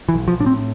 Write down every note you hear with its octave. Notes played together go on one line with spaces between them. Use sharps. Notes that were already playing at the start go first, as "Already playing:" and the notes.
E3
B1
F3
A2 D4
C4